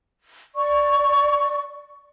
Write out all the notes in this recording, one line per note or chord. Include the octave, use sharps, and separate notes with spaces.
D5 C#6